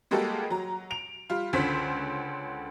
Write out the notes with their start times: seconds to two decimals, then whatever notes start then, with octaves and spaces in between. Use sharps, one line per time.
0.11 G3 G#3 A#3 F#4 G4 A4
0.50 F#3 A#5
0.90 D7 F7
1.30 G3 F4
1.53 C#2 D3 C#4 C5 B6